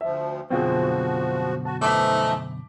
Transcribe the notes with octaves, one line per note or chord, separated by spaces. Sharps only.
D2 F3 E5
F#2 B2 D3 F3 C4 F4 F#4 G#4
F#4 A5
E3 F3 A3 D#4 D6 B6